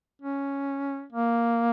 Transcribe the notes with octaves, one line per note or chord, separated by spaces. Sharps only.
C#4
A#3